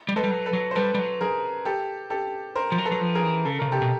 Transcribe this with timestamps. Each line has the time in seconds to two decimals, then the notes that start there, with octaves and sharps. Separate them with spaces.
0.09 G3
0.16 G#3 A4 B4
0.24 G3
0.31 F#3
0.46 A4 B4
0.53 F#3
0.71 C5
0.75 G3 A4 B4
0.94 G3
0.99 F#3
1.21 G#4 A#4
1.65 G4 A4
2.10 G4 A4
2.56 A#4 C5
2.72 F3
2.78 F#3
2.85 A4 B4
2.91 F#3
3.01 F3
3.15 G#4 A#4
3.23 E3
3.45 C#3 A4
3.59 C#3 A#4
3.68 C3 G4 A4
3.82 B2